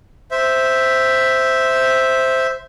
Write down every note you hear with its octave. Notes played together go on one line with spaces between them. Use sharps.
C5 E5